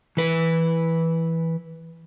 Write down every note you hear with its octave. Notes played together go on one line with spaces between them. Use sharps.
E3 B4